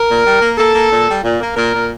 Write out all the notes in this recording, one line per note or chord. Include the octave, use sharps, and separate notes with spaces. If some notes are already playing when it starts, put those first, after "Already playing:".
Already playing: A#4
A#2
G3
A#3
A#3 A4
A#3
A#2
G3
A#2
A#3
A#2 A#4
A#2